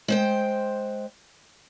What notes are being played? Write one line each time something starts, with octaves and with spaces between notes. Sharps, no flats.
G#3 C5 G5